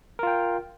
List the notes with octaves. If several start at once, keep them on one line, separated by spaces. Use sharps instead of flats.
F4 A#4 G5